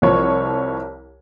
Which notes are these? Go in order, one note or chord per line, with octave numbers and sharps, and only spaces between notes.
C2 F3 C#5